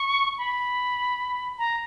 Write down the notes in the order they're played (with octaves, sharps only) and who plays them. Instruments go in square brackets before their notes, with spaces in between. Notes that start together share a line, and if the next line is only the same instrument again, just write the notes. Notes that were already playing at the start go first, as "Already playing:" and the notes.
Already playing: [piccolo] C#6
B5
A#5